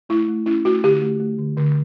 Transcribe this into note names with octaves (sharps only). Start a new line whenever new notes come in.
A3 E4
A3
C#4 E4
A3 F#4
D3 G4
A3
A3
D3
D3